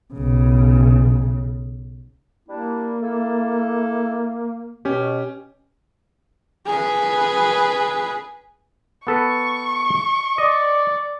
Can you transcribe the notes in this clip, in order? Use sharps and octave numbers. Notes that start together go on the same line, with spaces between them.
B1 C#3
G3 A#3 D4 E4
E4 A4
B2 C#4 G4
G#4 B4
B3 A4 B4 C#6
D5 D#5